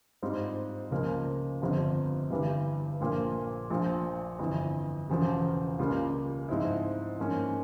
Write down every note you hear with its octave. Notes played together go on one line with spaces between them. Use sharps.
G#2 G3 C4 F4
C#2 C#3 F3 A#3
G1 F2 C3 F3
G1 G2 E3 G3
A#1 A#2 F3 A#3
A#1 A#2 F3
G1 F2 E3
E1 E2 C#3 F3
C#2 C#3 G3 A#3 F4
G#2 F3 C4 E4
G#2 F3 A#3 C#4